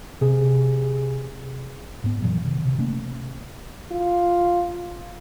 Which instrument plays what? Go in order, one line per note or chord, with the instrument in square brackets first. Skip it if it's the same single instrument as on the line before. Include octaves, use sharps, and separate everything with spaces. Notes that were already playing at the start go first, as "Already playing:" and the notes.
[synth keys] C3 G#4
[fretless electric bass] G#2 B3
F#2 A#2 E3 F#3
C3 D#3
C3
C3 A3 A#3 C#4
[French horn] F4